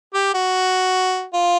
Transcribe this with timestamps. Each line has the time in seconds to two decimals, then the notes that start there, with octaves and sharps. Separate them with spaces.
0.14 G4
0.34 F#4
1.34 F4